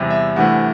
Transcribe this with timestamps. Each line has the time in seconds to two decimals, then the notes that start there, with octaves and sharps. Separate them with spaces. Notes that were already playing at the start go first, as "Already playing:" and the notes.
Already playing: E2 C3 G3 E5
0.10 E5
0.36 D2 C3 E3 A3 F#5